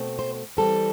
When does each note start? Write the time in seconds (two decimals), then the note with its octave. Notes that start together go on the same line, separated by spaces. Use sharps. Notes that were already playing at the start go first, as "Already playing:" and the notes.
Already playing: B2 A3 C4
0.19 C5
0.57 E3 G3 C4 A4